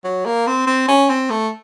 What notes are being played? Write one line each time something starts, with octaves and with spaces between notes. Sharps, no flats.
F#3
A#3
C4
C4
C#4
C4
A3